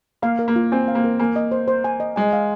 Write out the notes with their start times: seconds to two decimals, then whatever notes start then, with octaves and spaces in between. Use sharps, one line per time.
0.22 A#3 F5
0.39 A#4
0.48 A#3
0.56 F4
0.72 C4 G#5
0.88 F5
0.95 A#3
1.04 A#4
1.19 A#3 G#5
1.36 D#5
1.52 C5
1.68 C5
1.84 G#5
2.00 D#5
2.16 G#3 G#5
2.33 F5